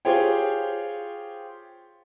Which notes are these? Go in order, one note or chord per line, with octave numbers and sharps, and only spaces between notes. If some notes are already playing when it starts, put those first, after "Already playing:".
F4 G4 G#4 C5 C#5 G5